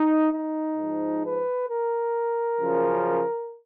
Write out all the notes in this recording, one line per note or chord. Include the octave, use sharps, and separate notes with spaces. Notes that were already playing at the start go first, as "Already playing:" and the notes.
Already playing: D#4
D#4
G#2 F3
B4
A#4
F#2 C#3 F3